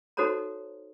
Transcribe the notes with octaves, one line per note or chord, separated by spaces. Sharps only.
D#4 F#4 A4 C5 C#5 A#5